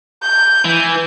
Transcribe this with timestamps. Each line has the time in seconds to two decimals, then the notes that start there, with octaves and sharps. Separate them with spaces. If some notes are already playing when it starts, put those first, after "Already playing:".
0.22 G6
0.65 E3